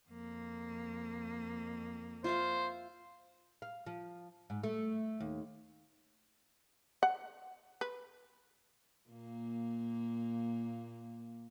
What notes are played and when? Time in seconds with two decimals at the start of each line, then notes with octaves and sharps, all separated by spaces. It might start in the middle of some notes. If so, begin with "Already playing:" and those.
0.10 F2 A#3
2.24 F4 C5 E5 F5
3.62 F5
3.86 F3
4.50 G#2
4.63 A3
5.20 D#2
7.03 F#5
7.81 B4
9.09 A#2 A#3